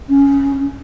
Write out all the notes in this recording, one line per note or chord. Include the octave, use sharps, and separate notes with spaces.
C#4